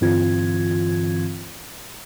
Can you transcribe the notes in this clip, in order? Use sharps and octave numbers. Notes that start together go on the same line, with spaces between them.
G2 D3 E3 C4 F4 G#6